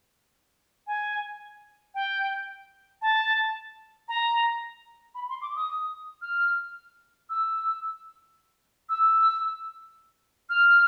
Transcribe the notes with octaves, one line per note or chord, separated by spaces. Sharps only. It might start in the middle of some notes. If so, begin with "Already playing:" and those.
G#5
G5
A5
A#5
B5
C6
D6
D#6
F6
E6
E6
F6